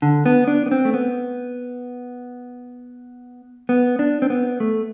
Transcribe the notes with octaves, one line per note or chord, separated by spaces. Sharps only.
D3
B3
D4
B3
C4
A3
B3
B3
D4
C4
B3
A3